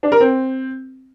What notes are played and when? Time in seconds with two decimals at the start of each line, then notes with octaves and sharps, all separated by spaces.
0.03 D4
0.12 A#4
0.20 C4